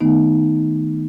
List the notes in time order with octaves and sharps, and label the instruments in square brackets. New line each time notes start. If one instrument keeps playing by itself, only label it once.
[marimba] D#3 A3 B3 D#4